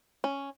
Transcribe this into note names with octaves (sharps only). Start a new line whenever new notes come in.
C#4